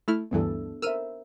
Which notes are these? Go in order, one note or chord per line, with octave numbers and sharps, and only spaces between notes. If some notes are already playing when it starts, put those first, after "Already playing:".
A3 E4 F6
D2 G2 E3 B3 D4 A4
A#4 C5 E5 E6 F6 D#7